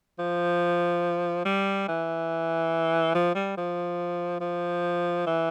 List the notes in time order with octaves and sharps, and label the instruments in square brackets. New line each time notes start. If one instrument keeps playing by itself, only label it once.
[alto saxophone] F3
G3
E3
F3
G3
F3
F3
E3